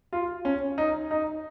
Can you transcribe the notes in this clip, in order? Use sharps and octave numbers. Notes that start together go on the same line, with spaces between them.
F4
C#4
D#4
D#4